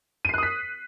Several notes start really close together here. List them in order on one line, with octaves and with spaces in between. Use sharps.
D#7 C7 F#6 D#6 B6